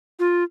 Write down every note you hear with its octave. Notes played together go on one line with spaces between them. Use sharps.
F4